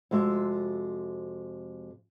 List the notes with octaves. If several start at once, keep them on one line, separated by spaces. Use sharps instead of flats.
F2 C3 G#3 F#4 E5